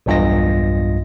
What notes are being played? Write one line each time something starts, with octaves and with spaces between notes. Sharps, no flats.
B1 E2 G2 F4 D#5 A#6